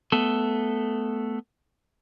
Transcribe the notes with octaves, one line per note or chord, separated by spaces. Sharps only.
A3 B3 A4